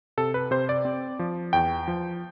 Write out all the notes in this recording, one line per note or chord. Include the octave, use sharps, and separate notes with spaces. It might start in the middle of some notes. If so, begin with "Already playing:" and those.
C3 A4
B4
C3 C5
D5
C4
F3
E2 G5
F3